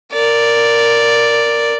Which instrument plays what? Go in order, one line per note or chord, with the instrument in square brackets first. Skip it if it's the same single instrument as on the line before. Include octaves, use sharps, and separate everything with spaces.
[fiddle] A#4 D5